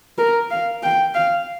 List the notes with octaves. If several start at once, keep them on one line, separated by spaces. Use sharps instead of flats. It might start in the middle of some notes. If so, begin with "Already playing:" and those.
A#4
F5
G5
F5